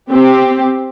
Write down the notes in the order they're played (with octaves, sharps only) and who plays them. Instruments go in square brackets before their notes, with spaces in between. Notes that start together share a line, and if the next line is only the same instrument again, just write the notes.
[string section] C4 G4